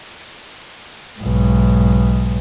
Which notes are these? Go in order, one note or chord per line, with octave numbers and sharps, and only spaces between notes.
B1 G#2